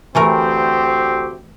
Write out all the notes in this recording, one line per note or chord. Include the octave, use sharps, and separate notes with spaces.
D2 E3 A3 C4 G4 A#4